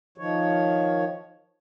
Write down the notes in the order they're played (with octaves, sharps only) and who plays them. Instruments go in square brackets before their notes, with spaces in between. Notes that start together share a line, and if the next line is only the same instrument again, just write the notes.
[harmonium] D#3 F3 C#5